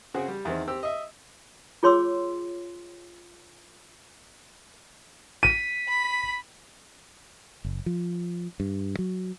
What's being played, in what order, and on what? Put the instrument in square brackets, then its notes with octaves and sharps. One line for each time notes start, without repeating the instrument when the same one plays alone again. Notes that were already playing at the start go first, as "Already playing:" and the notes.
[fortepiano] C#3 C4 F#4 G#4
G3
E2 D#3 C4
C4 G4 E6
D#5 E5
[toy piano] F4 G#4 C#5 C6 D6 E6
[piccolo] B6 [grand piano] D#7
[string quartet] B5
[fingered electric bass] F#1
F3
G2
F#3